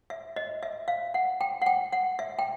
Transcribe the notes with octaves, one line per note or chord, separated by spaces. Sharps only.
E5
D#5
E5
F5
F#5
G5
F#5
G5
F#5
E5
G5